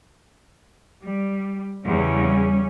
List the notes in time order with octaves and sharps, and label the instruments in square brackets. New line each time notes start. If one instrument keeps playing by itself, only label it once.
[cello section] G3
[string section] E2 [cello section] C#3 G3 C#4